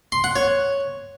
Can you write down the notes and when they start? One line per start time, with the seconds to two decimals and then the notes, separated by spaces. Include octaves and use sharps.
0.12 C6
0.24 F#5
0.36 C#5